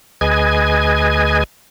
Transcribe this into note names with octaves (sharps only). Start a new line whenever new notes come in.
D2 G#4 B4 D#5 G#5 G#6